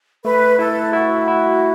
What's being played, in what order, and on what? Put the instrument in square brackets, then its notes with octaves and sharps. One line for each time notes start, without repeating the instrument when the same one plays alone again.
[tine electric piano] A3 [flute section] B4
[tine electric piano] E4 [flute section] A4
[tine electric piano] E4 [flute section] F#4
[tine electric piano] E4